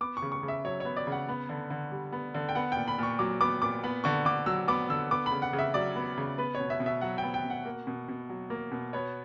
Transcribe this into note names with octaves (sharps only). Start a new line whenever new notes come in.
B3 D6
C#6
C#3
C#6
C#3
E5
F#3 C#5
B3 C#5
D5
C#3 F#5
B3
D3
D3
G3
B3
D3
G5
B3 F#5
A#2 G5
B5
A#2 C#6
F#3 D6
B3 D6
A#2 D6
B3 B5
D3 C#6
D3 D6
F#3 E6
B3 D6
D3 E6
B3 D6
B5
C#3
F#5
C#3
E5
F#3 D5
B3
C#3
B3 B4
C#5
B2
E5
B2
E5
F#3 F#5
G5
B3
G5
B2
F#5
A#3
B2
B2
F#3
A#3
B2
B3 C#5